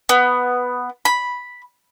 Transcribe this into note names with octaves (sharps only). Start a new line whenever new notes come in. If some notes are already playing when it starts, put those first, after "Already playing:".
B3
B5